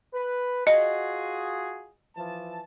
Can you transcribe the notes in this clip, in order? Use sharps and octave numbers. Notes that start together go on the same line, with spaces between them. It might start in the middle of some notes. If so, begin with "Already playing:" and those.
B4
F4 F#4 G#4 D#5
E3 F3 A5